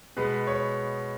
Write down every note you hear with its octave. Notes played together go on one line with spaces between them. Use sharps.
B2 G#3 B3 B4
C#5